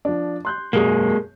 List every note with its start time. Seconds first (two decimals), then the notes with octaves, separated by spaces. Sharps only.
0.05 F3 D4
0.45 C6 F#6 G6
0.73 E1 F#2 G#3 A#3 G#4